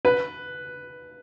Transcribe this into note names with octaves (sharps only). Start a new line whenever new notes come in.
B4